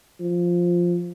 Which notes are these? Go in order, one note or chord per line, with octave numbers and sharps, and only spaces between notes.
F3